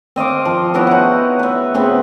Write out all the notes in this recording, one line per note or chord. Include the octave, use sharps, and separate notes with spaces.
C4 D#5 F5 D6
F3
B3 E4 F#4 C#5
D#4 F#5
B4 E5
C#3 B3 C4 B5